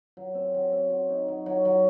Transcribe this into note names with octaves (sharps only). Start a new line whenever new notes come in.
F#3
C4
F#3
C4
F#3
D#4
F#3
F#3
F#3